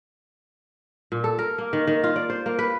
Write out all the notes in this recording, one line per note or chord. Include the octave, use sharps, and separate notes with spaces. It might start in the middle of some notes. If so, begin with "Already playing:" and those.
A#2
A4
A#4
A#3
D#3
D#3
F4
D5
C5
A#3
B4